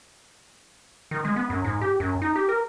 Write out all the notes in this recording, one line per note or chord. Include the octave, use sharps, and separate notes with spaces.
D#3
G#3
B3
F#2
G#2
G4
F#2
D#4
G4
A#4